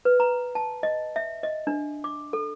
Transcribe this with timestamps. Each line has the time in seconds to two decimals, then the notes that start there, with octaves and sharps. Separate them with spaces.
0.05 B4
0.20 A#5
0.55 A5
0.83 D#5
1.16 E5
1.43 D#5
1.67 D4
2.04 D6
2.33 A4